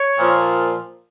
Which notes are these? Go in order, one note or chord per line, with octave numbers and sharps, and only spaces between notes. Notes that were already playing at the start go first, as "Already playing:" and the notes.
Already playing: C#5
A#2 F3